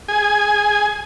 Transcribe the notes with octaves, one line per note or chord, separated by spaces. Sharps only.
G#4 G#5